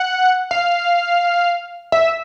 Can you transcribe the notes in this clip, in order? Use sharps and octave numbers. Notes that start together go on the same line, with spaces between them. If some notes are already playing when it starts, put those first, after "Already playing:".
Already playing: F#5
F5
E5